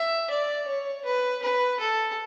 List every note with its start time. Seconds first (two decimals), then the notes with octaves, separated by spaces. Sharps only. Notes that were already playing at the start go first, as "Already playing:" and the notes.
Already playing: E5
0.30 D5
0.68 C#5
1.06 B4
1.43 B4
1.80 A4